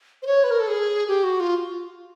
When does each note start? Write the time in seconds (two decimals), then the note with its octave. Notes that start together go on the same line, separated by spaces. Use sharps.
0.22 C5
0.27 C#5
0.44 B4
0.51 A#4
0.60 A4
0.68 G#4
1.08 G4
1.24 F#4
1.40 F4